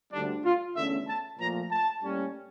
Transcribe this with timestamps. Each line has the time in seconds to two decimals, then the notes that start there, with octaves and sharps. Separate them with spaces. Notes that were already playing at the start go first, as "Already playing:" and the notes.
0.12 D2 D3 G3 D4
0.44 F4
0.76 E2 D3 A3 C#4 E5
1.08 A5
1.39 A#2 F3 A3 A#5
1.71 A5
2.02 A2 G3 A#3 C#4